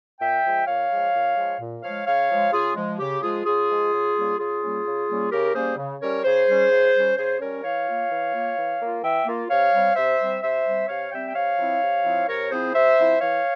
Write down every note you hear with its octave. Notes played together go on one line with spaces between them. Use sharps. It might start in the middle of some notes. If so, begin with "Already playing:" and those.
A#2 E5 G5
F3 G#3
A#2 C#5 F5
F3 G#3
A#2
F3 G#3
A#2
F3 G#3 C#5 F5
C#3 C#5 F5
F3 G#3
C#3 F4 G#4
F3 G#3
C#3 G4
F3 G#3 F4 G#4
C#3 F4 G#4
F3 G#3
C#3
G3 A#3 C#4
C#3 F4 G#4
G3 A#3 C#4
C#3
G3 A#3 C#4
C#3 G4 A#4
G3 A#3 C#4 G#4 C5
C#3
G3 C#4 A#4 C#5
C#3 G#4 C5
G3 C#4
C#3
G3 C#4
C#3 G#4 C5
G3 C#4 A#4 C#5
E3 C#5 F5
A#3 F4
E3
A#3 F4
E3
A#3 F4
E3 E5 G5
A#3 F4
C3 C#5 F5
G3 C4
C3 C5 E5
G3 C4
C3 C5 E5
G3 C4
C3 C#5 F5
G3 C4 E5 G5
G5
C3 C#5 F5
F3 C4 E4
C3
F3 C4 E4
C3 A#4 C#5
F3 C4 E4 G#4 C5
C3 C5 E5
F3 C4 E4
E3 C#5 F5